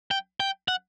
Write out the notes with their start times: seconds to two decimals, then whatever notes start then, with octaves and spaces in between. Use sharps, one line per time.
0.11 G5
0.40 G5
0.68 F#5